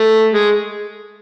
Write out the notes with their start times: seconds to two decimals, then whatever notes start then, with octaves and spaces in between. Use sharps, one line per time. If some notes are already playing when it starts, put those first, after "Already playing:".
Already playing: A3
0.34 G#3